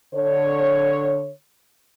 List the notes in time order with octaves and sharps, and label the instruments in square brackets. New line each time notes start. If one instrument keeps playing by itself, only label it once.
[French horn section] D3 C#5